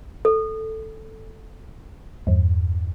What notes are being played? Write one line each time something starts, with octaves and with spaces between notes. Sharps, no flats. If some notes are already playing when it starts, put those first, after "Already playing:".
A4
E2 G2